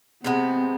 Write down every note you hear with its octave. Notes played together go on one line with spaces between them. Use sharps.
C3 G#3 B3 C4